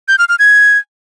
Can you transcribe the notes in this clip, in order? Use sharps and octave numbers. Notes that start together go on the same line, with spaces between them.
G6
F6
F6
G#6